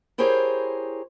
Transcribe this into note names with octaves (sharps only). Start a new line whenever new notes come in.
E4 G4 G#4 A#4 C5 C#5